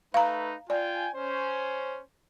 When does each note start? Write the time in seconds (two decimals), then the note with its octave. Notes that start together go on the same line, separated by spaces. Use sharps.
0.14 A3 D#4 B4 F5 A#5
0.70 F4 D5 G5 G#5
1.14 C#4 C5